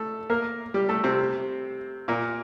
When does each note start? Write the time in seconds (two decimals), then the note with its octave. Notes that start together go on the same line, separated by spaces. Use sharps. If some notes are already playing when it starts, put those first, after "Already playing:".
Already playing: A3 A4
0.30 A#3 A#4
0.74 G3 G4
0.89 A3 A4
1.04 C3 C4
2.08 A#2 A#3